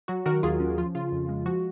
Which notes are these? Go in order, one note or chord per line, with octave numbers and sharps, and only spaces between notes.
F#3 F#4
D#3 F#4 A#4
D#2 F4 G#4
C#4
F3 F4
C#3 F4
F2
G#3
F3 F#4